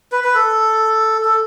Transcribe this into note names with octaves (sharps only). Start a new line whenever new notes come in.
B4
B4
A4
A4